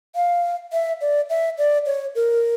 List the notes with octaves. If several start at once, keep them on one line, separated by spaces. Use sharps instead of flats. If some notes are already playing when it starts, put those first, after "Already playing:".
F5
E5
D5
E5
D5
C#5
A#4